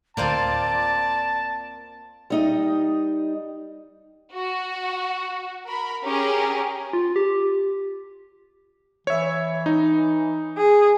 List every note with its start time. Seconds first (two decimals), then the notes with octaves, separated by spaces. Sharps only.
0.17 D2 A2 A#3 C4 F4 D5 A5
2.30 G3 D#4 D#5
4.34 F#4
5.66 A#4 B5
6.05 C#4 G4 G#4 A#4
6.93 F4
7.16 G4
9.07 E3 C#5 E5
9.66 D#4
10.58 G#4